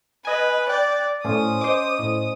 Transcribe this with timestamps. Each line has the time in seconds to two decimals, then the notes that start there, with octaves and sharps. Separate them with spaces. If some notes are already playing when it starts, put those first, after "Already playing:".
0.25 B4 D#5 G#5
0.69 D5 G5 F#6
1.24 A2 C#4 C5 D5 D#6
1.61 C5 D#5 D6
1.99 A2